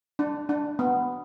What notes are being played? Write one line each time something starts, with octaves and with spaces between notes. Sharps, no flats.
D4
D4
B3